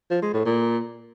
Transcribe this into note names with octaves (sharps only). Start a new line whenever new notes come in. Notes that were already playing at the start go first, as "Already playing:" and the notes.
F3
G#3
A2
A#2